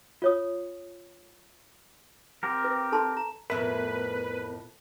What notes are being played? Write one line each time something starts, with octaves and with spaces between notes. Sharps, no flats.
F4 C#5 D#6
C4 G4 A#4
B4
A4 A5 C6
A#5
F2 A2 B3 A#4 B4 E5